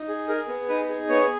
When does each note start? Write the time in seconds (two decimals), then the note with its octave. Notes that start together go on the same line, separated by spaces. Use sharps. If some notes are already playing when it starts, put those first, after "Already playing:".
Already playing: D#4
0.08 G#4
0.28 G#4 A#4
0.48 B3
0.69 D#4 B4
0.89 G#4
1.09 B3 C#5